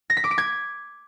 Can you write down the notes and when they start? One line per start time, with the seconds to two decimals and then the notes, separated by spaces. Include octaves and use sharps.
0.10 A#6
0.17 B6
0.24 D6
0.31 D7
0.38 G#6